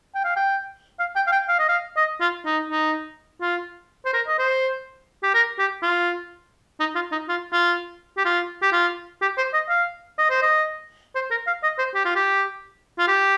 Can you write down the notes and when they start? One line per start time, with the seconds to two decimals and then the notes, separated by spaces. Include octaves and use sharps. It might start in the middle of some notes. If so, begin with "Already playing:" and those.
0.15 G5
0.24 F5
0.36 G5
0.99 F5
1.16 G5
1.27 F5
1.32 G5
1.48 F5
1.59 D#5
1.69 F5
1.97 D#5
2.20 F4
2.45 D#4
2.70 D#4
3.41 F4
4.06 C5
4.13 A#4
4.27 D#5
4.38 C5
5.23 G4
5.34 A#4
5.59 G4
5.82 F4
6.80 D#4
6.95 F4
7.12 D#4
7.29 F4
7.53 F4
8.17 G4
8.25 F4
8.62 G4
8.72 F4
9.22 G4
9.37 C5
9.54 D#5
9.69 F5
10.18 D#5
10.30 C5
10.42 D#5
11.15 C5
11.31 A#4
11.47 F5
11.63 D#5
11.79 C5
11.94 G4
12.05 F4
12.16 G4
12.99 F4
13.08 G4